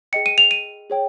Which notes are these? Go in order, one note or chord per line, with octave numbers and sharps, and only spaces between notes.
G#4 D#5 G5 C#7
D#7
F7
D#7
G#4 C#5 G5